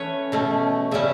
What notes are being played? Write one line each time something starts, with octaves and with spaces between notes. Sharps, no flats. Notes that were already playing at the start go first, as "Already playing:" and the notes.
Already playing: E3 A3 C#4 B4 C#5
B2 A3 C#4
C#3 G3 C#4 E5